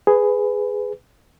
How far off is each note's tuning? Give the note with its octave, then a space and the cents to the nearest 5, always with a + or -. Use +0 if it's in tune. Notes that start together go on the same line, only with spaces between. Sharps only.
G#4 +0 B4 +15